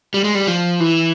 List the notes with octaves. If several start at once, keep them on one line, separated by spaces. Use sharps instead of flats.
G3
G#3
G3
F3
E3